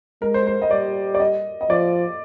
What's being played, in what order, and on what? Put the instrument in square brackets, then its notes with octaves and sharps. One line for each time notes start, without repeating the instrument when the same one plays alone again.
[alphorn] G#3 [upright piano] A#4
[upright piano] C5
C5
D#5
[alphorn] G3 [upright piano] D5
[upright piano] D5
D#5
D#5
[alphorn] F3 [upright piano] D5